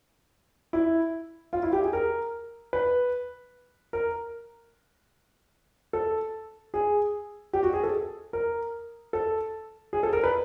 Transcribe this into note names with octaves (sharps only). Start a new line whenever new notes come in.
E4
F4
E4
G4
G#4
A#4
B4
A#4
A4
G#4
G4
F#4
G#4
A4
A#4
A4
G#4
A4
A#4
B4